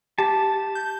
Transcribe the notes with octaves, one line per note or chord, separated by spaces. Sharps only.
G4 A5
G6